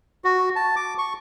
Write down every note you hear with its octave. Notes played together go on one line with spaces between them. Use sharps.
F#4
A5
D6
C#6